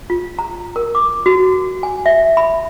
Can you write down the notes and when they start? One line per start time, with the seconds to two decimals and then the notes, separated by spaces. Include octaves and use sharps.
0.10 F4
0.39 A#5
0.76 A#4
0.95 D6
1.26 F#4
1.83 G#5
2.06 E5
2.37 B5